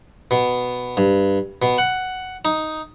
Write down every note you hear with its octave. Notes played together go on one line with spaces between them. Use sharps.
B2
G2
B2
F#5
D#4